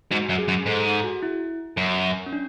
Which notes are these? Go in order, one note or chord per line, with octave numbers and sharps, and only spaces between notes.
G#2 F#4
F#2
G#4
F#2
G#2 A4
G#4
F#4
E4
F#2
C#4
D4